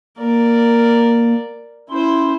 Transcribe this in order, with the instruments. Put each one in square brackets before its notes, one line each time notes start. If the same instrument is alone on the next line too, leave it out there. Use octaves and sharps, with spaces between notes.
[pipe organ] A#3 [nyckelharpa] A#4 D5
[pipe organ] C#4 C6 [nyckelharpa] E4 C5